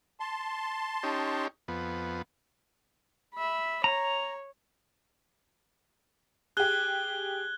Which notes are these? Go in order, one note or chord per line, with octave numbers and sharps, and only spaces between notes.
A5 C6
C#4 D#4 G4
F2 B3
E5 B5
C#5 A#5
G4 G#4 F#6 G#6 G7